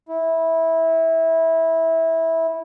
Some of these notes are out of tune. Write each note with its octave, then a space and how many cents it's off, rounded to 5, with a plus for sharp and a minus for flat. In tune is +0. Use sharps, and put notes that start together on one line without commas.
E4 -15